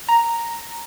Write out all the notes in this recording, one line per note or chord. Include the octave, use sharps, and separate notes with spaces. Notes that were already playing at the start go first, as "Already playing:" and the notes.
A#5